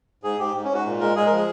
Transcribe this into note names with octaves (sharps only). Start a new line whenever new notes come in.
G#2 G#4
G#2 G4
G#2
C#4
G#2 F#4
A#2
G#3 A#4
G#3 G#4
A#4
F3
G#4